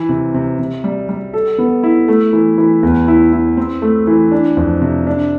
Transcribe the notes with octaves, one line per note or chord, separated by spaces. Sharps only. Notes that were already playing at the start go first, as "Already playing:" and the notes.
Already playing: E3
C3
C3
C3
G3
G3
A4
B3
E4
A3
E3
E3
E2
E4
E4
C4
A3
E3
D4
F2
C3
D4